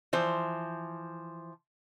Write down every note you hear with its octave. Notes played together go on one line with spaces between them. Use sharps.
E3 F3 C5